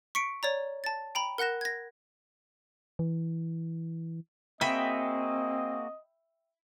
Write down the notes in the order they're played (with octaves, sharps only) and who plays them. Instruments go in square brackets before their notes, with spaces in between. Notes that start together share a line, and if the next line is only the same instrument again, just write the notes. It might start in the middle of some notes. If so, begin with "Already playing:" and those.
[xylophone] C#6 B6 C#7 D7
C#5 D5 A#5
A5 A6
G5 A#5 B5
A#4 F#5 F#6 A#6 E7
G#6 A#6
[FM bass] E3
[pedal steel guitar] A#3 F#4 G#4 [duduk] C4 [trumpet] D#5 [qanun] E5 G5 B5